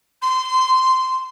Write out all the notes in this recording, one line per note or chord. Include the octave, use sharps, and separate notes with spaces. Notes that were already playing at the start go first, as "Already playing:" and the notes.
C6